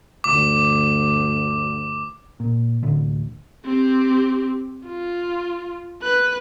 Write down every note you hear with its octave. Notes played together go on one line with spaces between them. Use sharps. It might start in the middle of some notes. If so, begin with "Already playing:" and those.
D2 G2 D6
A#2
D1 A1 D2 D3
C4 G4
F4
B4 F#6